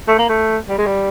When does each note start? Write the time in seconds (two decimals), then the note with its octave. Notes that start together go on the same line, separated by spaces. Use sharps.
0.08 A3
0.18 A#3
0.29 A3
0.69 G3
0.78 G#3
0.86 G3